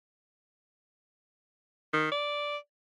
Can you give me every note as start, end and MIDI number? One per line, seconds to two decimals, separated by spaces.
1.93 2.07 51
2.12 2.57 74